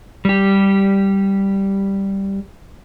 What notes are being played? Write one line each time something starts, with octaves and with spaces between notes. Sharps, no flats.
G3 G4